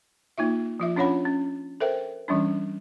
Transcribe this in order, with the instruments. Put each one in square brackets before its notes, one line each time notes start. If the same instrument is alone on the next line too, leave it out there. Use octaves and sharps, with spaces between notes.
[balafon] A#3 D#4 F4 E5
F3 F4 E5
C#4 D4 F4 C#5 F#5 B5
C#4
A4 A#4 C5 E5 G5
E3 G3 C#4 D4